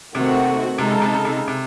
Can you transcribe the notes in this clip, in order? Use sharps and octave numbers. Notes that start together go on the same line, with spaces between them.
C3 D#3 A3 C4 F#4
C3 G#3 D#4 A4
C#3
C3
C#3
C3
C#3
C3